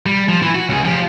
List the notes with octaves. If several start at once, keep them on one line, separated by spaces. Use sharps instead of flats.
G3
F3
E3
F#4
C#2 G#4
F3 G4